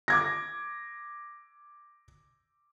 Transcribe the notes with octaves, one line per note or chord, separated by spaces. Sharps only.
D6 G#6 A#6